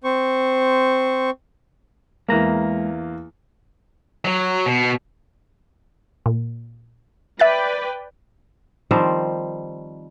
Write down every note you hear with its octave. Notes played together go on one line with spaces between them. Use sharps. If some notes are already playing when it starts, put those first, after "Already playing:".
C4 C5 C#6
E2 G#3 A#3 A#5
F#3
B2
A#2
B4 D5 E5 G5 F#6 A6
D#3 F3 G3 C4